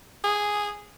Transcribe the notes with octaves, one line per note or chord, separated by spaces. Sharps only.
G#4